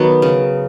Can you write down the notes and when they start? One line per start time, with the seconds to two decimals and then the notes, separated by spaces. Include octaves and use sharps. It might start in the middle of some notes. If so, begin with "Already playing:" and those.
Already playing: D#3 F#3 B3
0.22 C#3